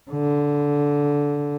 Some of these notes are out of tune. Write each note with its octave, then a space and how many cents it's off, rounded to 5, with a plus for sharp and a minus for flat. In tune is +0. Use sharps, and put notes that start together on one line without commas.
D3 -15